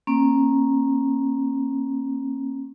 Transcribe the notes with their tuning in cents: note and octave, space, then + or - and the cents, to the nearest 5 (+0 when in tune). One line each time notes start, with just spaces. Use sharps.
A#3 +0 C#4 -35